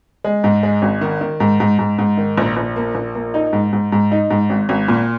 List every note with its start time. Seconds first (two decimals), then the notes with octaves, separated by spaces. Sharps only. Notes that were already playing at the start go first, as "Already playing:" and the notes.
0.24 G#3
0.44 G#2
0.63 G#3
0.82 G#1
1.01 D#3
1.21 D#3
1.40 G#2
1.60 G#2
1.79 G#2
1.98 G#2
2.17 D#3
2.37 A#1
2.57 A#1
2.76 A#3
2.95 A#1
3.15 A#3
3.34 D#4
3.53 G#2
3.73 G#2
3.92 G#2
4.11 D#4
4.30 G#2
4.50 G#1
4.69 G#1
4.88 A#2